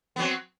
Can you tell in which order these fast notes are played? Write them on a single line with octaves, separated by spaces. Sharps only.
B3 F#3 C4